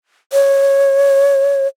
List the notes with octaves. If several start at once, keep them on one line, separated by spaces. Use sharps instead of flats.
C#5